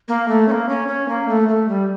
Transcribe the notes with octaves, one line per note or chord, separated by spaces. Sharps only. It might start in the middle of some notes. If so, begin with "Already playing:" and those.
A#3
A3
C#4
A#3
C#4
C#4
A#3
A3
A3
G3